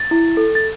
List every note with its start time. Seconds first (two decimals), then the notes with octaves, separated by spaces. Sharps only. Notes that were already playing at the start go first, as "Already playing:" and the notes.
Already playing: A6
0.11 E4
0.37 A4
0.55 A6